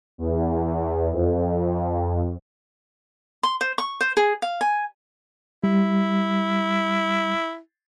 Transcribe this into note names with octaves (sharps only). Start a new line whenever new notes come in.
E2
F2
C6
C5
C#6
C5
G#4
F5
G#5
G3 E4